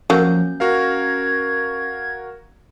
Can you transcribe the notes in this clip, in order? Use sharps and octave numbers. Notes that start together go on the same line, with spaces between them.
F3 F#3 A#3 C#4 G6
F#4 A#4 F5 G#6